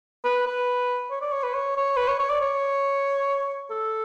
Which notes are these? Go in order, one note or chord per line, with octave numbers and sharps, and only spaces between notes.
B4
B4
C#5
D5
C#5
B4
C#5
C#5
B4
C#5
C#5
D5
C#5
A4